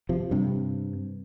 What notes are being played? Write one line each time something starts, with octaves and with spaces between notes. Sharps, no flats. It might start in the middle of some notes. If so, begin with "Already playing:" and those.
C3 F3
G2 C3